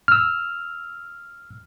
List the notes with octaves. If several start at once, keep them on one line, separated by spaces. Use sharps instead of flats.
E6 F6